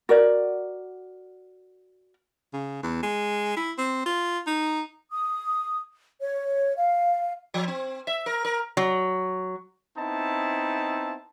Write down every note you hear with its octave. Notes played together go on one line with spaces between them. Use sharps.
F#4 A#4 D5
C#3
E2
G#3
E4
C4
F4
D#4
D#6
C#5
F5
F3
C4
E5
A#4
A#4
F#3
B3 C4 D#4 E4 A5